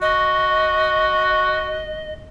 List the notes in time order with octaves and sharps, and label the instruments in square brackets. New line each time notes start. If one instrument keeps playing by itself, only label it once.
[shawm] F#4 [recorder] D#5